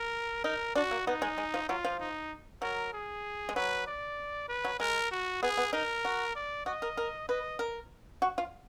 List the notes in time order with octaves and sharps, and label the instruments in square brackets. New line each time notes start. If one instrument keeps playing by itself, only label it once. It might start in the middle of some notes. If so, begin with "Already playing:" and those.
Already playing: [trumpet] A#4
[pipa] D#4 [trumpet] A#4
[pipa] D4 [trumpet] F#4
[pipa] A#3
[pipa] B3 [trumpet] D#4
[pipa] G#3
G#3
F3
[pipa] F#3 [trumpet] F4
[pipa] F3
[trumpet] D#4
[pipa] F#3 [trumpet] A#4
[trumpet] G#4
[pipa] G#3
[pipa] F#3 [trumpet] B4
[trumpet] D5
B4
[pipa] F#3
[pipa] G#3 [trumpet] A#4
[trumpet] F#4
[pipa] B3 [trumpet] G#4
[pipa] B3
[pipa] D#4 [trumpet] A#4
[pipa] F#4
[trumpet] D5
[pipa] F#4 [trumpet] D#5
[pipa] A#4
A#4
[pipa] B4 [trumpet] D#5
[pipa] A#4
F#4
F4